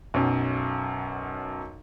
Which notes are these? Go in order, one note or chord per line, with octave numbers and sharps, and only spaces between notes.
B1 F#2